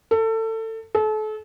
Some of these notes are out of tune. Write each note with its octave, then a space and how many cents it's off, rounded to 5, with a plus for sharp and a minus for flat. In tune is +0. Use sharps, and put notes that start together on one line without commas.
A4 +25
A4 -35